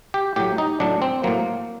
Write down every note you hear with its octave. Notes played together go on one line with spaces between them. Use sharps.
G4
A2 F#3 G4
D#4
A2 F#3 D4
C4
A2 F#3 A#3